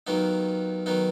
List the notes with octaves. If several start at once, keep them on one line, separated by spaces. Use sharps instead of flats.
D#2 D#3 F#3 B3 D#4
D#3 F#3 B3 D#4